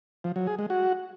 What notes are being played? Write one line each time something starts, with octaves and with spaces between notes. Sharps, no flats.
F3
F#3
G#4
G#3
F#4